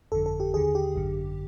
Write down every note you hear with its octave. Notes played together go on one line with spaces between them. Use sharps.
G1 F2 D3 A4
A4
G4
D#2 D3 G#4
G4
G#1 F#2 D3